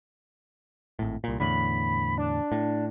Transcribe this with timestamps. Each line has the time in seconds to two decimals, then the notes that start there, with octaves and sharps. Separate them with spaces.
0.99 G#1 A2
1.24 C2 A#2
1.40 E2 A2 D3 B5
2.18 D4
2.52 A2